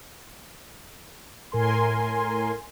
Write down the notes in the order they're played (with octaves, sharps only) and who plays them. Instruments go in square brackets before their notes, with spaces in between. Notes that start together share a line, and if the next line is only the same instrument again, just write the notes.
[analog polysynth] A2 A#4 G#5 C6